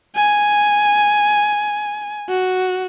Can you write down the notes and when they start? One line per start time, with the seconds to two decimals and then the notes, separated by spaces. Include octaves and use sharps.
0.16 G#5
2.29 F#4